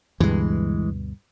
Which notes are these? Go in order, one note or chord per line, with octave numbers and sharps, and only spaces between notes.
D2 G2 B2 E3 G#3